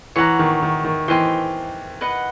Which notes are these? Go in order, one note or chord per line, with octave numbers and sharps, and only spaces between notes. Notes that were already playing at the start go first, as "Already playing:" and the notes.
E3 C#5 F#5 A#5
D#3
D#3
D#3
E3 C5 D#5 G5 C6
B4 D#5 F#5